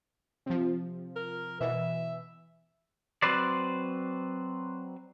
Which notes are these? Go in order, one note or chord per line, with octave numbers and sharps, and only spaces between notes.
C3 F3
A#4
B2 E3 E5
F#3 C4 B4 C5 D5